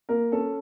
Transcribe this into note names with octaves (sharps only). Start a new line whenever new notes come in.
A#3 A#4
C#4 A4